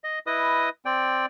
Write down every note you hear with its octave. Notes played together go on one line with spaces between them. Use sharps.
D#5
E4 B4 D#5 D#6
C4 D5 G5